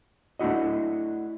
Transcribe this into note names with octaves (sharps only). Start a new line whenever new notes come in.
A3 D4 E4 F#4 D#5